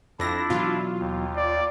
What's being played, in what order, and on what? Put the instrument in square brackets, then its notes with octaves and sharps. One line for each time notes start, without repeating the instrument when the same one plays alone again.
[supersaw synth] F2 A#6 [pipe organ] D4 E4
[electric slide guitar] B2 E3 F#3 [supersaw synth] F4
[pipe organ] D#2
[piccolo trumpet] D5